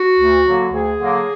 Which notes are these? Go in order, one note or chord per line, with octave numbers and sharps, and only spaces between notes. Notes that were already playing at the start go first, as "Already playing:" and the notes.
Already playing: F#4
D2
D3 F#3 A#3
D2 G#4
D3 F#3 A#3